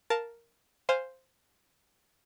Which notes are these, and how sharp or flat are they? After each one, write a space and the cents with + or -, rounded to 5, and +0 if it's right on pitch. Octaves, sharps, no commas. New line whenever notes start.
A#4 +0 F5 +0 A5 +0
C5 +0 F5 +0 G#5 -15